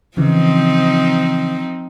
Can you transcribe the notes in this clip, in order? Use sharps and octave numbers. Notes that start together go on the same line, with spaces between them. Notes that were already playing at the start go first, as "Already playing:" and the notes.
C#3 E3 F3 C4 D#4